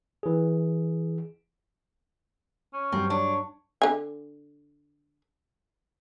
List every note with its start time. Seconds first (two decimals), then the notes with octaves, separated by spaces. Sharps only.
0.23 E3 G#4
2.74 C#4
2.92 G2 F#3 C4
3.10 D4 C#5
3.82 D3 G#5